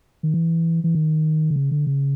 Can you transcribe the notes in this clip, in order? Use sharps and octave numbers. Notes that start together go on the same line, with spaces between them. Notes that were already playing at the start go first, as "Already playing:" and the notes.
D#3
E3
E3
D#3
D3
C#3
D3
C#3